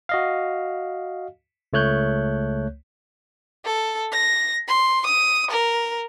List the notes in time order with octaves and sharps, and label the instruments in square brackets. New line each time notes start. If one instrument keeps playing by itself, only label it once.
[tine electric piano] F#4 D#5 F5
C#2 A3 C#5 F#6 G6
[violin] A4
A#6
C6
D#6
A#4